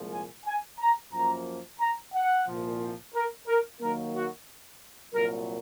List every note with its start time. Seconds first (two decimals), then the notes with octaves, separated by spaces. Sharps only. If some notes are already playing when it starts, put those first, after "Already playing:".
Already playing: C2 A#2 F3 G#3
0.12 G#5
0.46 G#5
0.79 A#5
1.13 F#2 F3 A#3 A#5
1.80 A#5
2.13 F#5
2.47 C2 A#2 F3
3.14 A#4
3.47 A#4
3.81 D#2 D#3 F#3 A#3 A#4
4.14 F#4
5.14 C2 A#2 F#3 A#4